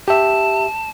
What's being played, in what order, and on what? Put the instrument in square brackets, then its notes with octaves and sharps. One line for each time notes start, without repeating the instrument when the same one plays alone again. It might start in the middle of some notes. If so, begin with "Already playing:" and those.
[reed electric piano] G4 E5 [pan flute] A5